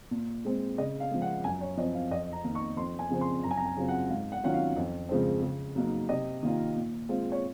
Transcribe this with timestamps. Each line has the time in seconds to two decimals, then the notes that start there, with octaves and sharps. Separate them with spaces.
0.11 A#2
0.45 G#3 C4
0.78 C#3 D#5
1.00 F5
1.11 F3 G#3
1.22 F#5
1.44 F#2 G#5
1.61 C#5
1.77 F3 C4 D#5
1.95 F5
2.11 F2 D#5
2.32 A#5
2.44 D#3 A#3 D#4
2.55 C#6
2.77 F2 C6
2.99 G#5
3.10 C#3 F3 C4
3.21 C6
3.43 F#2 A#5
3.51 G#5
3.57 A#5
3.65 G#5
3.77 C#3 F#3 C4 F4
3.88 F#5
4.10 G#2 F5
4.32 F#5
4.44 D#3 F#3 C#4 F4 F#5
4.54 F5
4.76 F2
5.09 C#3 F3 G#3 C4
5.42 C#3
5.76 F#3 A#3 D#4
6.09 C3 D#5
6.43 D#3 A#3 F4
6.76 A#2
7.09 G#3 C4 F4
7.32 C#5